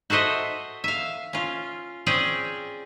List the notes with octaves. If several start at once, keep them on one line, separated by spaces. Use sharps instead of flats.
F#4 A4 C5 D#5 E5
E5 F5
C#4 F4
C4 C#4 G#4 D5 G5